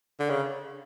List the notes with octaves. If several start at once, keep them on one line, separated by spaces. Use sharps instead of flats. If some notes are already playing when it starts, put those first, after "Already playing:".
D3
C#3